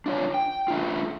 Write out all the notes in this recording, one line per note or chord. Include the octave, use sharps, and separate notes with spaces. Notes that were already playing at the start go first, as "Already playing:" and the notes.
D4 F4 C#5
G5
A3 D4 F4